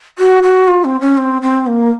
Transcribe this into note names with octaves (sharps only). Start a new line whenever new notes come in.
F#4
F#4
F4
C4
C#4
C4
C4
A#3